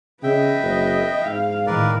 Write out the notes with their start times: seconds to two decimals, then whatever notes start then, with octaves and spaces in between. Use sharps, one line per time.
0.23 C#3 B4 D#5 E5 G5
0.62 F#1
1.25 G#2 F5
1.67 A2 D#3 A#4 B4 D5